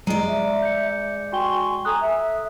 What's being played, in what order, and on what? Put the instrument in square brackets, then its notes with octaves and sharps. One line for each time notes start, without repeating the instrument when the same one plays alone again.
[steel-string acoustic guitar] G#3 D5 [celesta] A#5
[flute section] E5
[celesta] G6 C#7
[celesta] F#4 G5 G7 [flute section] G#5 C6 C#6
[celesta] A4 D#6 F#6 [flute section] G#5 A#5
[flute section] E5